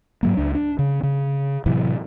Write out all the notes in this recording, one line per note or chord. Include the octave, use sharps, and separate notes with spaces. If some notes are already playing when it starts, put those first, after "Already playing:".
G#2 F#3 A#3
C#2 D4
D4
C#3
C#3
A2 C3 E3 F#3